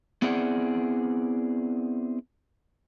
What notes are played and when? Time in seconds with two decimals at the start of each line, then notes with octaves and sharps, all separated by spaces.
0.22 B3 C4 E4 G#4 D5 F#5